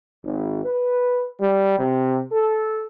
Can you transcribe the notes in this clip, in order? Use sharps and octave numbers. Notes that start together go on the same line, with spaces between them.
G#1
B4
G3
C3
A4